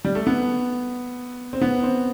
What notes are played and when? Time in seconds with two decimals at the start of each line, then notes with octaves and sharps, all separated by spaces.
0.05 G3
0.15 A3
0.27 B3
1.53 C4
1.61 B3
1.83 C4